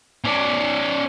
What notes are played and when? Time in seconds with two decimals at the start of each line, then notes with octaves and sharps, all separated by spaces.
0.24 C#4 D5